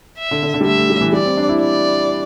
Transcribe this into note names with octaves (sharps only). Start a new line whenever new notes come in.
E5
D3
D3
D3
G3
A3 E5
A3
G3
E3
G3 D5
C4
D4
E4
D5